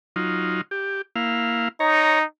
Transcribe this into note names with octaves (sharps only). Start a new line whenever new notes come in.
F#3 D#4 F4
G4
A#3 E4 F5
D#4 C#5 A#5